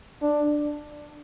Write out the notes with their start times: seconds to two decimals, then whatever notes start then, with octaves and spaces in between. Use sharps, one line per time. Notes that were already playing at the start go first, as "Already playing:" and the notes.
0.22 D4